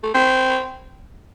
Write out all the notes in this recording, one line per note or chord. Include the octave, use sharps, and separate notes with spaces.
A3
C4